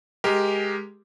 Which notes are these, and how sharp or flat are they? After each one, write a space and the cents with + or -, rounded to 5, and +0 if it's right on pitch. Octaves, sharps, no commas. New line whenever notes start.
G#3 +0 G4 +0 A#4 +0